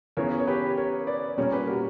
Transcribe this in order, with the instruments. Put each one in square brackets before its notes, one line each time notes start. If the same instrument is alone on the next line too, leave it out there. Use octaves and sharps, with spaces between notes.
[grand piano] C#3 E3 B3 [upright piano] A#4 C#5
[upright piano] C#5
G4 B4
A#4 C#5
B4 D5
[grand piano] A#2 G3 C#4 [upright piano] A#4 C#5
[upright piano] G4 B4
F#4 A#4